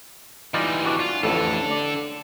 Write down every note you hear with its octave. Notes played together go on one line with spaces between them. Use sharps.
E3 G3 D#4 F4 D5
D4 F#4
F4
A1 F2 A2 D3 A4
D5